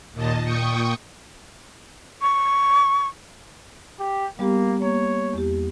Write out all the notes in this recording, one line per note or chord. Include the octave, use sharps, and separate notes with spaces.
D#2 A#2 D#5 A5
A#2 G5 C#6 D#6
C#6
G4
G3 A#3 B3 G4
A#3 C#5
E2 G4